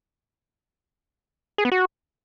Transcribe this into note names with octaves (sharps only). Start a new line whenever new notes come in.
G#4
B3
F#4